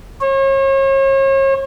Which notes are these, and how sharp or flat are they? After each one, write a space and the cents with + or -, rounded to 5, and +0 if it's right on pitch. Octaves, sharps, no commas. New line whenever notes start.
C#5 -40